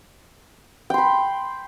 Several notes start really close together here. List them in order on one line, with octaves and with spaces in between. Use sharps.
G5 C6 B5